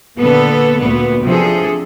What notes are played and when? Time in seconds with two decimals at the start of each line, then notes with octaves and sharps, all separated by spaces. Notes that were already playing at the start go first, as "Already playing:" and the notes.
0.19 A#2 D3 B3 A4
0.79 D2 A#2 A3 B3
1.24 C3 F3 D4 G#4 A4